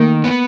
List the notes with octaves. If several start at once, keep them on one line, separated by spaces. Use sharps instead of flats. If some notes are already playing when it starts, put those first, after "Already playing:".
Already playing: D#3 A3 A#3
B3